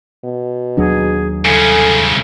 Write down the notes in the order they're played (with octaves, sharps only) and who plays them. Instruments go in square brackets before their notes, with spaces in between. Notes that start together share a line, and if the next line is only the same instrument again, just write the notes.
[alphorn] B2
[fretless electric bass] D#2 F#3 D4 [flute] G#4
[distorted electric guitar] C2 C#3 [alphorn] A4 [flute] G#5